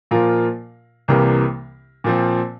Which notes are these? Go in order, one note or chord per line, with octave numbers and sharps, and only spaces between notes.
A#2 F3 A#3 F4 A#4
C2 C3 E3 G3 A#3
A#2 F3 C4